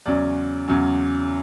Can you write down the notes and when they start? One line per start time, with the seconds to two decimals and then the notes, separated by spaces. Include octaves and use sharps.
0.06 E2 C#3 F#3 C#4 D5
0.68 E2 C#3 F#3 C#4